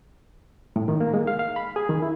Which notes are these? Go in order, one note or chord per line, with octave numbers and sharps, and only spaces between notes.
A2
D#3
A#3
G#3
F5
F5
B5
G#4
D#3
E4